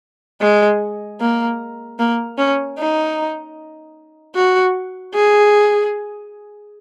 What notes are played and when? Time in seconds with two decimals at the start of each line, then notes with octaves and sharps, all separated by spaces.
0.41 G#3
1.21 A#3
1.99 A#3
2.38 C#4
2.79 D#4
4.35 F#4
5.14 G#4